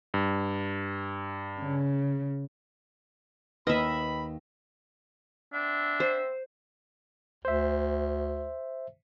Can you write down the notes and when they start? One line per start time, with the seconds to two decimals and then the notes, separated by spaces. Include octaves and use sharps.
0.14 G2
1.60 C#3
3.67 D#2 B4 D#5 E5 B5
5.53 B3 C4 D4 E5
6.00 C5
7.45 D2 C5 E5